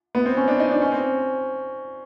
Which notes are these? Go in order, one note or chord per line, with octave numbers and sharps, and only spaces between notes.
B3
C4
C#4
D4
D#4
D4
C#4
C4